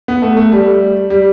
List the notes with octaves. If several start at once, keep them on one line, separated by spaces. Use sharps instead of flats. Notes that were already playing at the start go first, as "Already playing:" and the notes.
B3
A3
A3
G3
G3